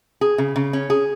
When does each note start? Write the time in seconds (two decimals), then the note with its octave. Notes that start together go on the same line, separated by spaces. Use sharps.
0.21 G#4
0.38 C#3
0.56 C#3
0.73 C#4
0.90 G#4